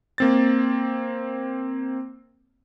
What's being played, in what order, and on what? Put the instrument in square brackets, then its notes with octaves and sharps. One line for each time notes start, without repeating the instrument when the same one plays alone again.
[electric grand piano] A#3 C4 A6